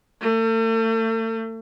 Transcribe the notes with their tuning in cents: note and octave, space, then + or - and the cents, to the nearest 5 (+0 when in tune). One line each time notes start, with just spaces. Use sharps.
A3 +40